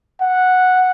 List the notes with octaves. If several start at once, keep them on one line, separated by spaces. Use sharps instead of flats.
F#5